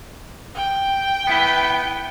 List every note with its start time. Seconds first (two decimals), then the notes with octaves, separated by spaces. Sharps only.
0.55 G5
1.27 B3 E4 B4